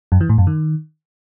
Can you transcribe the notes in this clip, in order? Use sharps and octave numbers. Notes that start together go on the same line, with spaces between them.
F#2
E3
A2
F#2
D#3